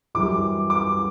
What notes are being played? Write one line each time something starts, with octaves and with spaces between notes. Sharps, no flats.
F#2 E3 G3 D6
D6